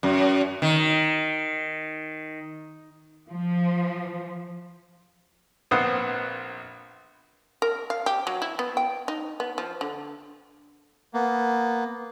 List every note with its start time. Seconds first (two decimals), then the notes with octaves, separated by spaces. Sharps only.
0.03 F#2
0.62 D#3
3.30 F3
5.71 A#1 B3 C4 C5 F#5 D#6
7.62 A#4
7.90 F5
8.06 G4
8.27 F#3
8.42 E4
8.59 B3
8.77 G5
9.08 D#4
9.40 B3
9.58 F3
9.81 D3
11.14 A#3 B3